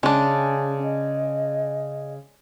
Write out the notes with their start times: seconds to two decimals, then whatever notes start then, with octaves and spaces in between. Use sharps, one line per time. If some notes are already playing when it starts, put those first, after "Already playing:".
0.03 C#3 G#3 C#4 D4
0.83 D#5